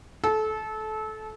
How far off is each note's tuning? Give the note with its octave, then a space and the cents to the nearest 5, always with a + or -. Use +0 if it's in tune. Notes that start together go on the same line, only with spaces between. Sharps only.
A4 -25